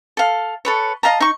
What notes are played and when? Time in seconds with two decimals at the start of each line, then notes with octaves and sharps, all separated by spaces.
0.17 A4 F5
0.65 A4 B4 C#5
1.03 D#5 F5 A5 A#5
1.20 D#4 C#6